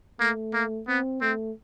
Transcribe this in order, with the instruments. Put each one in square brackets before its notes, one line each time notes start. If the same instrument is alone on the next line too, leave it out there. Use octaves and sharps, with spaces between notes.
[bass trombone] A3 [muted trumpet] A#3
[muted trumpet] A#3
[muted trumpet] B3 [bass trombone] C4
[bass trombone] A3 [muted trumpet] C4